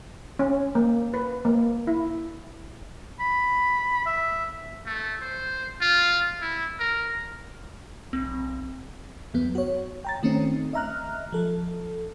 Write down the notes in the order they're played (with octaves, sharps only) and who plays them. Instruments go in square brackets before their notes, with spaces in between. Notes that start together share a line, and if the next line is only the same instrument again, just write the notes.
[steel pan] C#4
A#3
B4
A#3
E4
[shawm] B5
E5
[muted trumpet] A3
C5
F4
E4
A#4
[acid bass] B1 [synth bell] C4
[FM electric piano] E2 F#3 B3
F#4 C#5
G5 A#5 A6
D#3 A3 C4 C#4 D#4
D#5 E5 A#5 F6 F#6
F3 A4